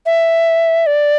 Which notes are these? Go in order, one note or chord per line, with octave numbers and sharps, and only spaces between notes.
E5
D5